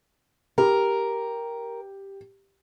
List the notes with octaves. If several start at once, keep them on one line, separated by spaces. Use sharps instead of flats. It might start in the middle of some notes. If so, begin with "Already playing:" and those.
G4 A#4